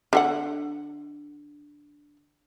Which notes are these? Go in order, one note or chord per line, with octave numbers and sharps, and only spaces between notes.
D3 G4 F#5